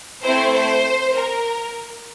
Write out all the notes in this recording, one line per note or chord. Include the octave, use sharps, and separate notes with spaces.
A3 C4 E4 C5
C5
A#4